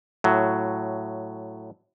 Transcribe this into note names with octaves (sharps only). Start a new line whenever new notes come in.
A2 F#3